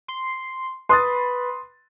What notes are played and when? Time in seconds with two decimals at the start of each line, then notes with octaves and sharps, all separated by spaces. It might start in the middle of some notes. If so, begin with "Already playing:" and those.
0.08 C6
0.89 B4 C6 D#6 A6